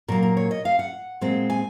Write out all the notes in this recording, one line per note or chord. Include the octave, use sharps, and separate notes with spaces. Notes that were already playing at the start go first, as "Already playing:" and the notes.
A#2 F#3 A#3 A#4
A#4
C#5
D#5
F5
F#5
A#2 G#3 C4
G#5